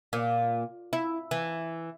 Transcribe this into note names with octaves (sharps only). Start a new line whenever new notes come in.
A#2
E4
E3